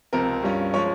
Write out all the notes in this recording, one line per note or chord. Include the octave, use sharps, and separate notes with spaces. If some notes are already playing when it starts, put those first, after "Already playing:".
C#2 C3 F3 C4 A#4
G2 G3 C#4 F4
F3 G#3 C#4 C#5